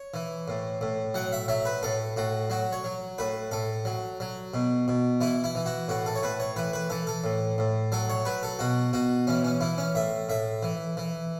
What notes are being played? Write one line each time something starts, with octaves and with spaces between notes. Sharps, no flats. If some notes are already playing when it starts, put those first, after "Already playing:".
Already playing: C#5
E3
A2
A2
F#3 F#5
E5
F#3 E5
B4
A2 A4
A2 F#4
F#3 F#4
C#5
F#3
A2 B4
A2 A4
F#3
F#3
B2
B2
E3 E4
E4
E3
F#4
A2 F#4
A4
C#5
A2 B4
C#5
E3 B4
B4
E3 A4
A4
A2
A2
F#3 A4
C#5
F#3 B4
A4
B2 F#4
B2 F#4
E3 C#4
C#4
E3 E4
C#4
A2 E5
A2 E5
E3
E3